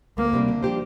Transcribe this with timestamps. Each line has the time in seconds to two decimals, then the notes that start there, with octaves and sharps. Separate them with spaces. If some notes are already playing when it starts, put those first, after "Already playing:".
0.18 D2 A#3
0.33 C3 G3 D4
0.48 D3
0.63 F3 D4 G4 C5